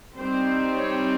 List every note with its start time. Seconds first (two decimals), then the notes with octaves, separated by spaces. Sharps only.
0.17 G3 C4 D#4 C5
0.75 C#5